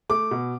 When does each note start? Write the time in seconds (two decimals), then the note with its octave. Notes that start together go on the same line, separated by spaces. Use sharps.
0.09 A3 D6
0.31 B2